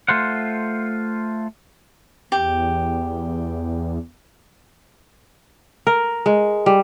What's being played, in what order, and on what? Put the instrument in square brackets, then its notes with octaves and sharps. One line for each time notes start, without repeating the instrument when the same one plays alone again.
[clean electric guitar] A3 F4 C5 F#5
[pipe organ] E2 [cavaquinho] G4
[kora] A#4
G#3
G3